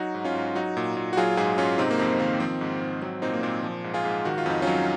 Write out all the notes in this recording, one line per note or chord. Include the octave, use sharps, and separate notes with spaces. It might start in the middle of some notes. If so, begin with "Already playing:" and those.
Already playing: F#3 D#4 F#4
G#2
C#4 F4
G#2
F#3 D#4 F#4
A#2
A#2
F#4
F#3 F4 G#4
G#2 F4 G#4
G#2 C#4 F4
C3 C4 D#4
A#3
F2 C4
D#3 A#3
F3 C4
G#2
G#2
F#3 C4
A#2 C4 D#4
A#3
A#2 C4
F3
G#2
F4 G#4
G#2
D#3 F#4
F4
F2 D#4
F#3 C#4 F4